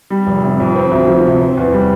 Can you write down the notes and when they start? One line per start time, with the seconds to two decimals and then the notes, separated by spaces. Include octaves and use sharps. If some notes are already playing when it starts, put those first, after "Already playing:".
0.10 G3
0.26 F1
0.44 C3
0.60 F2
0.76 C4
0.91 D2
1.08 F3
1.24 C3
1.41 C4
1.57 E2
1.73 G3